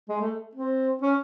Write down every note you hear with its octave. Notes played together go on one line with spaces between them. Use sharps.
G#3
A3
C4
C#4